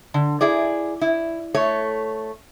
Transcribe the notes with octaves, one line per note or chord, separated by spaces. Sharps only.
D3
E4 G#4 D5
E4
A3 C#5